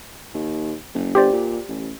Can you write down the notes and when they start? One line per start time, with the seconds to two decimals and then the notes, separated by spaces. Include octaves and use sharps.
0.34 D#2
0.94 F#1
1.15 G1 G4 C5 D5
1.32 A#2
1.68 A1